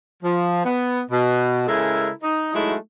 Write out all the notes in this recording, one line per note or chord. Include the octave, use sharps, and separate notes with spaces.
F3
B3
B2
C#3 G#3 E4 A4 A#4 A#5
D#4
F#3 G#3 A3 D#4 E4 F#4